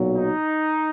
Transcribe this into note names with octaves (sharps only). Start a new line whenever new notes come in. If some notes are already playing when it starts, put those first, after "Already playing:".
Already playing: B1 A#2 F#3
D#4